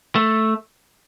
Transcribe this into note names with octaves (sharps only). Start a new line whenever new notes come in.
A3